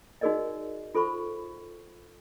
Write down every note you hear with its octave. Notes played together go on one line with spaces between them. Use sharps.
D#4 F#4 G#4 A#4 D5 D#5
F4 A4 C5 B5 C#6